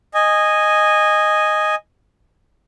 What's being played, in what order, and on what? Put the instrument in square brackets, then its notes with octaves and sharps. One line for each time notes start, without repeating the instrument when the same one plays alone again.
[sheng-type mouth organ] D#5 G#5